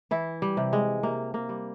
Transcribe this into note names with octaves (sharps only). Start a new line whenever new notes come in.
E3 E4
G3
C3
G#3
C3 A#3
A#3
G3